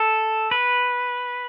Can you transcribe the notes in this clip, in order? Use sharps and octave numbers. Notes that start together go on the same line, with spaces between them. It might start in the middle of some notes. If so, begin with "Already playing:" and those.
Already playing: A4
B4